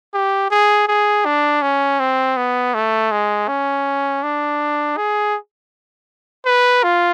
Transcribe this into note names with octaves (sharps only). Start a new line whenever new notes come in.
G4
G#4
G#4
D4
C#4
C4
B3
A3
G#3
C#4
D4
G#4
B4
F4